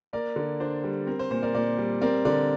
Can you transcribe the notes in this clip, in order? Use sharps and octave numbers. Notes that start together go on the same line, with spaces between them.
A#3 A#4 D5
D3
D4 C5
G3
C4 A#4
C5
A#2 C5
A#4 D5
A#2 A#4 D5
G3
C4 A#4 D5
D3 A#4 D5